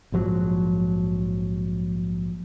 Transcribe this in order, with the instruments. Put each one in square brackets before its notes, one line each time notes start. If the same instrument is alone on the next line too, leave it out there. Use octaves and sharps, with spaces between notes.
[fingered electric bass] A#1 G#2 F3 F#3